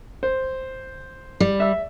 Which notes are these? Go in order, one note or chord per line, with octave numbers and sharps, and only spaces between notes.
C5
G3
E5 E6